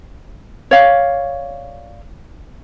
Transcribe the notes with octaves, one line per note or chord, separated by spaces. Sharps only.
C#5 D5 F5